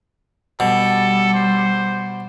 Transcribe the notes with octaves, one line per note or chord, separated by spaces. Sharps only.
B2 G3 A4
C5